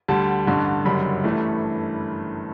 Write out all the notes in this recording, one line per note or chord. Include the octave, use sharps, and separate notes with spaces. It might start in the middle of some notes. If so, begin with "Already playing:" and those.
D2 D3 G3 A5
A1 G2 D3
F#1 F#2 D3 G3 B5
G1 G2 E3 A3